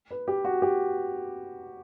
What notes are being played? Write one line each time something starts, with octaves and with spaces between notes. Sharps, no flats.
B4
G4
F#4
G4